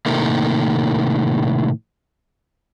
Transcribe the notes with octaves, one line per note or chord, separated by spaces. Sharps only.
A2 C3 D#3 A3 A#3